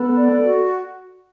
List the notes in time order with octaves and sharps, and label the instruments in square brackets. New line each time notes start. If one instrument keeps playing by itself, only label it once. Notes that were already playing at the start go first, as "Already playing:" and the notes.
Already playing: [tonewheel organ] B3 [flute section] A4
[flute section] D5
F#4